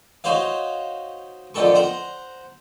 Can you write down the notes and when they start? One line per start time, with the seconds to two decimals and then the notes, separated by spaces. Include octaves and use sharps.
0.24 D#4 F#4 C5 C#5 F5
1.54 F2 D3 D#3 A4 C#6
1.75 C5 F#5 A#5